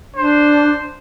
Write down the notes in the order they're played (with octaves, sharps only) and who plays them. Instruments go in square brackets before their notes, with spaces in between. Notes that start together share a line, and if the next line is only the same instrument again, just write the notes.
[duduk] D4 [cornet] C5